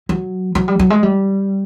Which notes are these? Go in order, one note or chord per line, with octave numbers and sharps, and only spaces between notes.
F#3
F#3
G3
F#3
G#3
G3